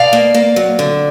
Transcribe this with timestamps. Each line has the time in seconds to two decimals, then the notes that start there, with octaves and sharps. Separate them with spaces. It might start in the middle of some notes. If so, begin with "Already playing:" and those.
Already playing: B2 D5 F5
0.13 A#3
0.34 A#3
0.56 F#3
0.79 D3